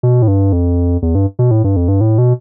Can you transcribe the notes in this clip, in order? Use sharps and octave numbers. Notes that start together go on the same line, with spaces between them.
B2
A2
G2
F2
E2
G2
B2
A2
G2
F2
G2
A2
B2